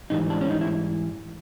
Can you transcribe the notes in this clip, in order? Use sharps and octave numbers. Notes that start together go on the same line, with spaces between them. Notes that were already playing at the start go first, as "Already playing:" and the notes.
G#2 E3 G3 D#4
D4
C#4
D#4
E4